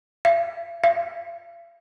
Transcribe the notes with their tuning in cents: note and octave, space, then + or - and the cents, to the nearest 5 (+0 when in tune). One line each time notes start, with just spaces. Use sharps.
F5 -45
F5 -40